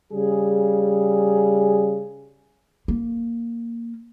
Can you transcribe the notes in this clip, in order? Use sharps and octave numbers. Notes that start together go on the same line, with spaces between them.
C#3 G3 G#4
A#3